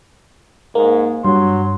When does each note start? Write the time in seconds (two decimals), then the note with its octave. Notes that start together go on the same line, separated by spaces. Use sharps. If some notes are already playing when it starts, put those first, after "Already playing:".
0.75 G#2 A#3
1.25 G2 F#3 C6